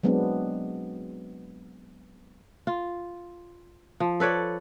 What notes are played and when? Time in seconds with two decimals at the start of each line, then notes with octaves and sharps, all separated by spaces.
0.03 F#3 G#3 B3 C4 D4
2.67 F4
4.00 F3
4.20 A4 B4 C#5 D5